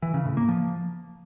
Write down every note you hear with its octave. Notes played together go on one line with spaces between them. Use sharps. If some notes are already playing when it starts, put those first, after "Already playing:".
E3
C#3
A2
A#3
F3